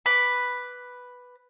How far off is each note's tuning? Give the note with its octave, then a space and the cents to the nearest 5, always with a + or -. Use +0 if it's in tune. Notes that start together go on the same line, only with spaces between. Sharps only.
B4 +0 B5 +0 D6 +0